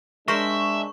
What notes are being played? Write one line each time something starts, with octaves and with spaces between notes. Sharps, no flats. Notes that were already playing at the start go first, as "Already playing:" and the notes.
G#3 D4 A#4 C5 E5 C#6